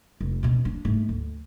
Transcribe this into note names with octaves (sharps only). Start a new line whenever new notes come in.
F1
B2 C#4
D4
G#2 A3
D2